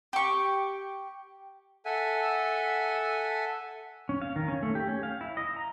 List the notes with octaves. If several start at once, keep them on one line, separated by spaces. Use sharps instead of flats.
G4 C#6
A4 E5 F#5 G#5
C#4
F5
D#3
C#4
A3
G4
C#4
F5
E4
D#5
A#5